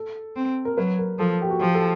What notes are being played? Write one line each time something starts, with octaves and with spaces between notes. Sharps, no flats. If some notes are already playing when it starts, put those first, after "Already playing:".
Already playing: A4
C4
A#4
F#3 B4
A#4
F3 A4
G4
F#4
F3 G4
A4